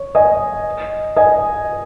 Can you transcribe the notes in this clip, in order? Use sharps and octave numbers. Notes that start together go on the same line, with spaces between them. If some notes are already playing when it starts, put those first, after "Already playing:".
Already playing: C#5
D#5 G#5
D#5 G#5